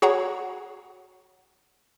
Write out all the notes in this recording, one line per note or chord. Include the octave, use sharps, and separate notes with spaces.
F#4 G#4 C#5 F#5 A#5